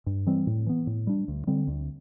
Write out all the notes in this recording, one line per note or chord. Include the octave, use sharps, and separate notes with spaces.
G2
E3 G3 C4
A2
E3 B3
A2
G3 D4
D2
D3 G3 C4
D2